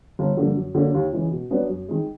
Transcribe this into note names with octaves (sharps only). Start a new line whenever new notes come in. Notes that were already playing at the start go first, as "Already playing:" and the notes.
G1
G2 D3 F3 A#3
F#2
D3 F#3 A#3
D#2
C#3 E3 G#3
B2
F#3 B3 D4
F#2
D#3 G#3